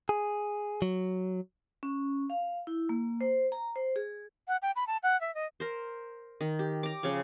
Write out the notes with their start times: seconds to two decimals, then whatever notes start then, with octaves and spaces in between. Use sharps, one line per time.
0.09 G#4
0.82 F#3
1.83 C#4
2.30 F5
2.67 E4
2.89 A#3
3.21 C5
3.52 A#5
3.76 C5
3.96 G#4
4.48 F#5
4.62 G5
4.76 B5
4.87 A5
5.03 F#5
5.21 E5
5.35 D#5
5.60 A#4 C5
6.41 D#3
6.59 G4
6.83 A#5 D6
7.03 C#3 F3 C#5 F5